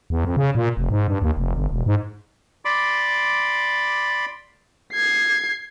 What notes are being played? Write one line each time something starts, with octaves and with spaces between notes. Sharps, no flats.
E2
F2
C#3
A#2
F1
G#2
G2
D#2
F1
G1
E1
G#2
D5 B5 C6 D6
G#6 C7